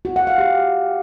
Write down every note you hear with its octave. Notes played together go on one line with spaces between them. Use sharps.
F#4
F#5
F5
G4